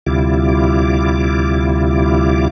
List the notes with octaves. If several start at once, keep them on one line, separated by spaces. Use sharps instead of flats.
D2 C3 G3 E4 F4 D6